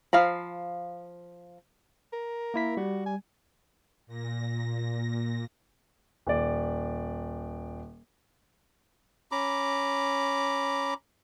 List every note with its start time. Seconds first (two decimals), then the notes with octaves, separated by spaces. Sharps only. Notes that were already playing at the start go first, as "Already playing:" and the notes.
0.13 F3 F5 A#5 B5
2.13 A#4
2.54 A#3 E4 B6
2.77 G3 F#4
3.06 G#5
4.07 A#2 A#6
6.27 D#1 D5
9.32 C#4 A#5 B5 D6